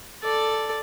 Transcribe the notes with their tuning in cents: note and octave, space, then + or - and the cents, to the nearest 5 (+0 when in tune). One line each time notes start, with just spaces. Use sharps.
A4 +0 D5 +0